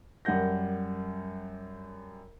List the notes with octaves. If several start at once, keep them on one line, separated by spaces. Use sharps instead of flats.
F#2 G3 A#4 F#5 G6 A#6